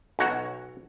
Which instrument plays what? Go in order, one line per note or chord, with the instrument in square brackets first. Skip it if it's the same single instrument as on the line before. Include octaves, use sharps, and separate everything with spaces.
[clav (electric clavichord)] B1 F#4 C#5